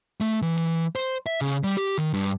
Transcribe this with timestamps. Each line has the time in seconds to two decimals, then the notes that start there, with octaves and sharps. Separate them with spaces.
0.21 A3
0.42 E3
0.57 E3
0.96 C5
1.26 E5
1.41 C#3
1.64 G3
1.77 G4
1.98 D#3
2.14 G2